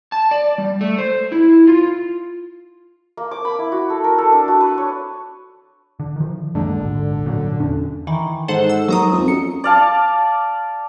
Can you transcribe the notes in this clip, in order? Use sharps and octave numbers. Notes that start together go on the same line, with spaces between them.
A5
D5
G3
A3
C5
E4
F4
A#3
D6
B5
E4
F#4
A4
A#4
A4
D4
F#4
B4
C#5
D3
D#3 F3
F#2 D3 G#3 A#3
D#1 G#1
G#1 A#2 F#3
E2 C#4 D4
D#3 E3
G#2 A4 C5 F#5
E6
D#2 F#3 A#5 D#6
F2
F#2 C#7
D5 F5 A5